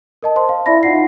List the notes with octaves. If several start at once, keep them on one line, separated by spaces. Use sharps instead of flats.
A#4 D#5 A5
C5 A5 C6
F5
E4 D5 E5 B5 A#6
D#4 F4 F#5 C7